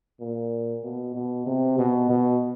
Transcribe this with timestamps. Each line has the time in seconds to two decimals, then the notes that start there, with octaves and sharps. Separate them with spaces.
0.20 A#2
0.84 B2
1.15 B2
1.47 C3
1.78 B2
2.10 B2